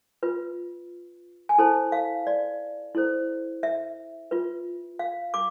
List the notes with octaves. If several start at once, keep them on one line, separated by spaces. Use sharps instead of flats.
F4 B4
G#5
E4 A4 C5 A5
F5
D5
E4 A4 C5
E5
F4 B4
F5
D6